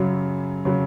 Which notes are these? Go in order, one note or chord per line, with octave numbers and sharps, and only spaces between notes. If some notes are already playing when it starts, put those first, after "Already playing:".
Already playing: F#2 C#3 F#3
C#3 F#3